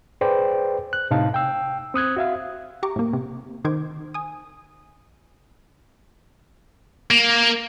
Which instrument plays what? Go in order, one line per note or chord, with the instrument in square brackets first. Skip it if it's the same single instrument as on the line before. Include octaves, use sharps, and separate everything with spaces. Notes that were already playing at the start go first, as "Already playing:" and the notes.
[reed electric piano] G#4 B4 C5 D5 G5
F#6
A2 C3 D#4 F5 A5
G5 E6
C4 D#6 F#6 G#6
F#4 E5 F5
[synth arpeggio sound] G4 A#5 C#6 D6
A2 A#3
C3
D#3 C5 D6 G#6
G#5 D#6
[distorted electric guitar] A#3